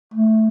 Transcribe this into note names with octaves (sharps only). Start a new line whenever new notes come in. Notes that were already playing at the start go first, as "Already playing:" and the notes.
A3